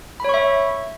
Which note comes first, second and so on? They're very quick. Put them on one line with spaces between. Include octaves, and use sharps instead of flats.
B5 C#5 C#6 E5